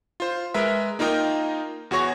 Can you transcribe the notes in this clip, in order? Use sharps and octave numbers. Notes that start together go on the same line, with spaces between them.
F4 C5
G#3 A#4 B4 E5
A#3 D#4 F4 A#4 D#5 G5
E2 F#4 G#4 C#5 C#6 A#6